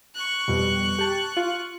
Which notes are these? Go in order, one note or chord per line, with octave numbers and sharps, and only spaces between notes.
C#6 F#6
F2 B2 G3
G4 A5
F4